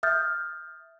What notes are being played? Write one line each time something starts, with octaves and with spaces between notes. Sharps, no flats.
E5 D#6 F6 G6 A6